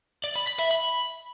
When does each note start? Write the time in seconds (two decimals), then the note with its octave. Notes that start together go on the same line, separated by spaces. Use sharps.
0.24 D5
0.35 B5
0.47 B5
0.59 E5
0.71 B5